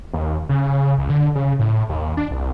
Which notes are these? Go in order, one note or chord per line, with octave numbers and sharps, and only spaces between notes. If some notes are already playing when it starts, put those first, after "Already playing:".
D#2
C#3
C#2
D3
C#3
A2
D#2
D4
C2